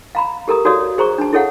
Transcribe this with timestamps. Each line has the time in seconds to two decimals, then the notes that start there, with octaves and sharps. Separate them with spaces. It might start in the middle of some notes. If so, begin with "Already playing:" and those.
0.15 F5 A#5 B5
0.48 G4 A4 A#4 A#5 D#6
0.65 F#4 A4 C#5 D5 F5 D#6
0.98 G#4 C5 A#5 C#6
1.18 D4 A5
1.33 E4 G#4 A4 C#5 F5 F#5